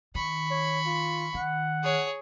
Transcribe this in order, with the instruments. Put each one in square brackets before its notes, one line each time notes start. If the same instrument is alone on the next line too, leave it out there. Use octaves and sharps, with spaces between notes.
[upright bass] D#3 [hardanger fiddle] B5 C#6
[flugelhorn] C#5
F4
[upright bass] D#3 [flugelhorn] F#5
[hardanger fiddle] G#4 C#5